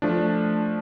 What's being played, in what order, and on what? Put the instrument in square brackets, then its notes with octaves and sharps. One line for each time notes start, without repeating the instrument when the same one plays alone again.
[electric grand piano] F3 A3 D4